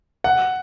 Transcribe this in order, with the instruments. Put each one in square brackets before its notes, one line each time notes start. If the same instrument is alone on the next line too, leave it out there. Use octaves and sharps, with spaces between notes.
[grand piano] F#5